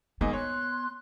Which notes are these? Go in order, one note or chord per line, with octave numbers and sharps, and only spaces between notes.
G#2 A#3 B3 D#5 G#5
C#5 C6 F#6